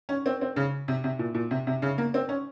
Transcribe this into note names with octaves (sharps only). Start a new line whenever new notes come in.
C#4
C4
C4
C#3
C3
C3
A#2
A#2
C3
C3
C#3
A#3
C4
C#4